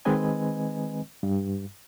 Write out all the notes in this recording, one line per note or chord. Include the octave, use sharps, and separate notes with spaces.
D#3 G#3 C4 B4 D#5 G#5
G2